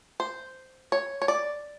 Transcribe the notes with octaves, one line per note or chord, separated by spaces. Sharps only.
C5
C#5
C#5
D5